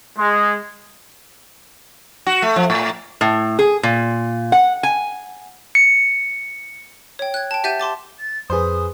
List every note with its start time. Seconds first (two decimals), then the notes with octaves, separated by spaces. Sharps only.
0.18 G#3
2.27 F#4
2.42 A3
2.56 F3
2.70 A2
3.21 A2
3.59 G#4
3.83 A#2
4.52 F#5
4.83 G#5
5.75 C#7
7.19 C#5 G5
7.34 F#6 G#6
7.51 G5 A5
7.64 G4 E5 F#5 G6 A6 D#7
7.80 A5 C6 D6 A6
8.19 A6
8.50 F2 G#4 B4 C5 D#6